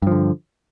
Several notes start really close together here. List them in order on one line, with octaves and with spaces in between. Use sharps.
G2 F3 D3